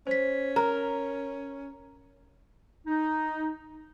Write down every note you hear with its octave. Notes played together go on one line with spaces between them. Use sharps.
C#4 C5 B6
A#4 A#5
D#4